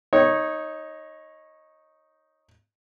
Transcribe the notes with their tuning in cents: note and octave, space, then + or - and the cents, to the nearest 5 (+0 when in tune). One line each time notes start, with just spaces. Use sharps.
D#4 +5 C#5 -15